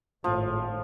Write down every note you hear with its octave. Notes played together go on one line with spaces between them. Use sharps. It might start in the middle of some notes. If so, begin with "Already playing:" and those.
G#1 A2 F3